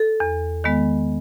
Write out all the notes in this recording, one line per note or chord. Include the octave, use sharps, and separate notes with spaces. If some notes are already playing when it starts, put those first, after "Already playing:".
Already playing: A4
E2
D#3 G#3 B3